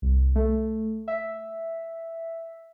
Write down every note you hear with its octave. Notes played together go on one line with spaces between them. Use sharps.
C2
A3
E5